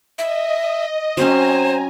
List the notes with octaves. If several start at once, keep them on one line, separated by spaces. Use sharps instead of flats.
D#5 E5
F#3 C4 C#4 C5 G#5 A#5